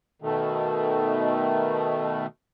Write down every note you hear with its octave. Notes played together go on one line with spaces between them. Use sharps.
B2 D#3 A3